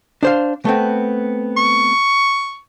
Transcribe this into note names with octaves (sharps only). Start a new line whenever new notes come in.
D4 C5 F5
A3 B3 C4
C#6